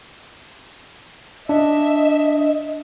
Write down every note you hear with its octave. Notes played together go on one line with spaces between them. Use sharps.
D4 D#5 E5